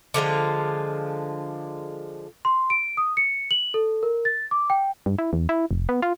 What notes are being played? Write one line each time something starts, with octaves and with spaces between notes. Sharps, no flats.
D3 F3 G#3 F4
C6
D7
D#6
C#7
F#7
A4
A#4
A6
D6
G5
G2
E4
E2
E4
F1
B3
F4